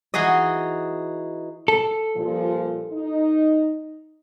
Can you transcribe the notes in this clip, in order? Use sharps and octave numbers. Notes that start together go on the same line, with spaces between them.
E3 D#4 F#4 G#4 D#5
A4
G2 A#2 F3
D#4